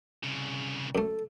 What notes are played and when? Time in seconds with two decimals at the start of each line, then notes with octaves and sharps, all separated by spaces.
0.23 C2 C#3
0.95 F#2 A3 A4